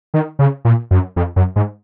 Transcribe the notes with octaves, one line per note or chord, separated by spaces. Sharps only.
D#3
C#3
A#2
F#2
F2
F#2
G#2